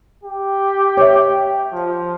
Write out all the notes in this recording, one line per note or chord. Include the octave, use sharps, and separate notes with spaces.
G4
C#5 E5
F3